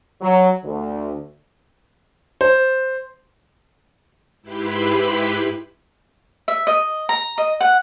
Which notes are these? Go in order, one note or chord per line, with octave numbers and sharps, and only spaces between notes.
F#3
D2
C5
G#2 E4 G4 B4 B5 C6
E5
D#5
A#5
D#5
F#5